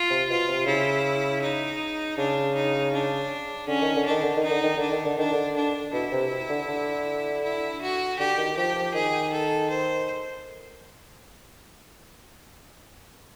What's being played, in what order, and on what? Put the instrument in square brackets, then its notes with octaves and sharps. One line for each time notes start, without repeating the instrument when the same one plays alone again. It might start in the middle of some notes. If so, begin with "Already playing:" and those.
Already playing: [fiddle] F4
[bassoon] C3
[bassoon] B2 [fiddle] F4
[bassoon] C3
[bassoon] C#3 [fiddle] E4
[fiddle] D#4
[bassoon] C#3 [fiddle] D4
[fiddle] D#4
D4
[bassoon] D3 [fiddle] C#4
[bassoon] D#3
D3
[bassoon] D#3 [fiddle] D4
[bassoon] D3
D#3
[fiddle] D#4
[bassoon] D3
D#3
[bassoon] D3 [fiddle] D4
[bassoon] D#3
D3
[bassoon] D#3 [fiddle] D4
[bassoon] D3
[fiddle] D4
[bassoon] B2 [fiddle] E4
[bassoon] C3
D3
D3
[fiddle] E4
F#4
[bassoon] D3 [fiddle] G4
[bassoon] D#3
[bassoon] F3 [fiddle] G4
[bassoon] F3
[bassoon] D#3 [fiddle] G#4
[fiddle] A4
C5